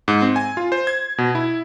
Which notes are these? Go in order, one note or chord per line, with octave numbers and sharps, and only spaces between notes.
G#2
C4
G#5
F4
C5
G#6
B2
E4